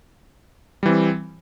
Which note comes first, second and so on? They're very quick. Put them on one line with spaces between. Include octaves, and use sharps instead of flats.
G3 E3 C4